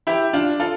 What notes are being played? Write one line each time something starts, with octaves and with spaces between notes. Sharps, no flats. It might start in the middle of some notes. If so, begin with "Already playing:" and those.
E4 G4
D4 F4
F4 A4